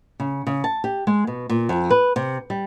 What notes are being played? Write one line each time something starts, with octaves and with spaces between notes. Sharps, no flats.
C#3
C#3
A5
G4
G#3
B2
A#2
F2
B4
C3
G3